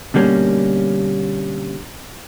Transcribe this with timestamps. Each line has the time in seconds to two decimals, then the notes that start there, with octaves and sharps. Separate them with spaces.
0.14 B2 D3 G3 A#3 C#4